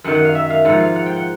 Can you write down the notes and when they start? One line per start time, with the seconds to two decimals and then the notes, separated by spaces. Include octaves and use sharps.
0.04 F#2 D#3 F#5
0.15 F#5
0.25 F5
0.35 E5
0.50 F5
0.65 G#2 F3 F#5
0.80 F5
0.96 F#5
1.06 G5
1.16 F#5